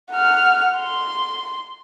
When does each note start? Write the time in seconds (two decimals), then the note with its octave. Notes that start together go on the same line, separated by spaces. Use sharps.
0.11 F#5 F6
0.78 C6